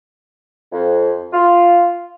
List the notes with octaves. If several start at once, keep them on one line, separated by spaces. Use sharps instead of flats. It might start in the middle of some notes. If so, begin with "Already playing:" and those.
F2
F4